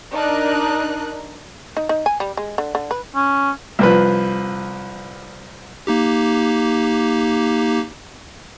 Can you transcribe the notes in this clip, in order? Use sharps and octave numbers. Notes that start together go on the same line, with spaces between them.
D4 D#4 A#4 F#6
D#4
D#4
G#5
G3
G#3
D3
D3
B4
C#4
C2 F3 B4
A#3 D#4 G4